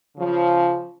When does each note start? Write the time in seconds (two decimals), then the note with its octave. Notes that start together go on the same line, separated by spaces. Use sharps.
0.17 C#3 F3